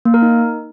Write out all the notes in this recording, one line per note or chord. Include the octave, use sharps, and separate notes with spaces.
A#3
A#4
D#4